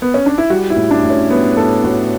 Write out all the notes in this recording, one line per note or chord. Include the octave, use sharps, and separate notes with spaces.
B3
C#4
D4
E4
G3 F#4
E4
A2
D4
A2
C#4
G3 B3
A2 A4
A2 F#4